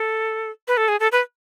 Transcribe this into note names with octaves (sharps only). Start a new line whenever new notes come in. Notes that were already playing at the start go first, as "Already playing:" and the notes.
Already playing: A4
B4
A4
G#4
A4
B4